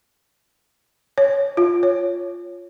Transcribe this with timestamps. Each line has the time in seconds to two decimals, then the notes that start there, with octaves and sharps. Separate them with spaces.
1.18 C#5
1.57 F4
1.83 C#5